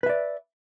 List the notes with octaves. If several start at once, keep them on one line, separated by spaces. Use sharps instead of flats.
B4 D5 E5